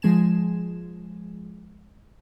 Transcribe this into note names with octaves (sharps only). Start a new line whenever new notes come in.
F3 G#3 G#5 E7